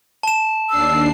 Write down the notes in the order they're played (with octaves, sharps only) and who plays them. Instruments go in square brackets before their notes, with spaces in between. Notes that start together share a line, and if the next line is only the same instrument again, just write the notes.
[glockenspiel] A5 E7
[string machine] D#2 D4 C7 [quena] E6